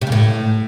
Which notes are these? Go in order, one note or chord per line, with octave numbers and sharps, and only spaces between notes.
C3
C#3
A2